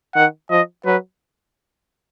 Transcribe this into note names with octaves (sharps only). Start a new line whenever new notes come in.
D#3 F#5
F3 D#5
F#3 B4